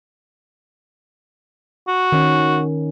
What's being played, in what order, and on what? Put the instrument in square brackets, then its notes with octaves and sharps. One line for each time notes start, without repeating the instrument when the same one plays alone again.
[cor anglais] F#4
[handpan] D#3 C#4